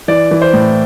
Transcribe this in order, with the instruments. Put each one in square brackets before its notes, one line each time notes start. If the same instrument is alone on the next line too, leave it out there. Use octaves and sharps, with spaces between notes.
[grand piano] E3 D5
E3
C5
A2